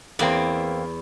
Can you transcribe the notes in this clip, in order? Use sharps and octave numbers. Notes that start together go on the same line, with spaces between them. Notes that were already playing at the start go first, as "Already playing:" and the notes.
E2 E3 A#3 C4 D5